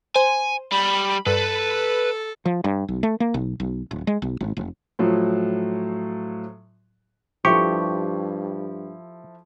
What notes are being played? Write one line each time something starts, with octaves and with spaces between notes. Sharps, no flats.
C5 G#5
G3 B5
G2 A4 B4
F3
G2
B1
A3
A#3
B1
B1
D1
G#3
B1
G#1
F1
A2 F3 F#3
G2 F3 E4 G4 A4 C#6